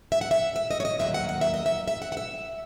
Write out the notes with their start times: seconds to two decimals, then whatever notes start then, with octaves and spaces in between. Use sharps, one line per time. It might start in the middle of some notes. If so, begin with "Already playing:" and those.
0.12 E5
0.21 F#5
0.31 E5
0.56 E5
0.71 D#5
0.80 C#5
0.85 D#5
0.99 D#2 C#3 F#3 A#3 E5
1.14 F#5
1.29 F#5
1.41 E5
1.54 D#5
1.66 E5
1.88 E5
2.02 F#5
2.12 F#5
2.17 E5